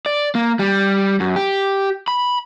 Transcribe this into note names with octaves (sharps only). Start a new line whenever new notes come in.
D5
A#3
G3
F#2
G4
B5